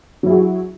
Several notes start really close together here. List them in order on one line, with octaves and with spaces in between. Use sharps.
F#3 E4 G#4 F#4